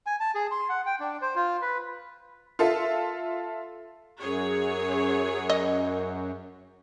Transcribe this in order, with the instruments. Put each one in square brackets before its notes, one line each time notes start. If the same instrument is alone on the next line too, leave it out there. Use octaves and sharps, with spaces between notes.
[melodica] G#5
A5
G#4
C6
F#5
G5
D4
C5
F4
B4
[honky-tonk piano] F4 A4 E5
[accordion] F#2 [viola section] G#4 C#5
[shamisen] D#5